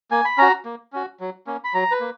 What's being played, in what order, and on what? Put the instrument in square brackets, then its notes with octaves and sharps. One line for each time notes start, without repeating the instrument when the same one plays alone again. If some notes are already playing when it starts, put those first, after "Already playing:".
[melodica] A#3 G#5
B5
C#4 F#4 A#5
A#3
C#4 F#4
F#3
A#3 C#4
B5
F#3 A#5
B4
A#3